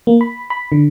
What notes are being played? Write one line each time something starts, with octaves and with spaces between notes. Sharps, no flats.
A#3
B5
B5
D3